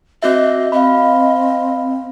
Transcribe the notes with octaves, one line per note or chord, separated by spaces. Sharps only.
C4 F#4 D#5 E5
C4 D#5 F5 B5